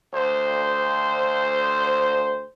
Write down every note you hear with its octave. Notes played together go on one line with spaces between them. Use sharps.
D2 C5